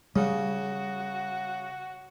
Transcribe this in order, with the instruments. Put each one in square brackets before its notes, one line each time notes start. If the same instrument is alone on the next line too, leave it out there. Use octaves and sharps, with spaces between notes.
[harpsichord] C#3 [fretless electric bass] G3 [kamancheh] F#4